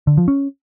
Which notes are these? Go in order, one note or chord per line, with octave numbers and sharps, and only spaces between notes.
D3
F3
C#4